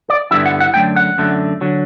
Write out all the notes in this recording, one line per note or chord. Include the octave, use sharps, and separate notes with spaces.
D5
G2 D3 G3 B3 E4 E5
F#5
F#5
F#2 D3 A3 G5
F#5
F#2 D3 A3
D3 F#3